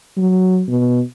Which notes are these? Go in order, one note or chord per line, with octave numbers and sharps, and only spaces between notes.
F#3
B2